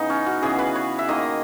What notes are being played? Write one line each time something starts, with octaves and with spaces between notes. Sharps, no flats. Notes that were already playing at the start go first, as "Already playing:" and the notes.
Already playing: C#3 E3 B3 D#4
C#4
F#4
C#3 E3 B3 G#4
B4
C#5
E5
D#3 A#3 D#5